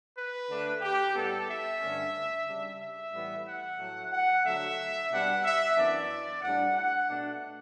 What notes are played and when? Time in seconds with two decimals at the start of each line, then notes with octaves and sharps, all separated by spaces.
0.15 B4
0.49 D3 A3 D4
0.81 G4
1.14 A2 G3 B3 A4
1.48 E5
1.80 G2 D3 A3 C#4
2.47 C#3 G3 D4
2.79 E5
3.13 A2 E3 G3 B3
3.46 F#5
3.78 A2 F#3 A3
4.11 F#5
4.44 D3 F#3 A3 E5
5.10 B2 G3 B3 D4 F#5
5.43 E5
5.76 F#2 E3 B3 D4 D5
6.42 A2 G3 D4 F#5
6.75 F#5
7.08 B2 A3 D4